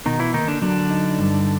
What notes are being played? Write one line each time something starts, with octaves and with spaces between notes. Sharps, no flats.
B2 D#3 D#4
E3 E4
D#3 A#3 D#4
D3 D4
D3 F#3 D4
D#4
G2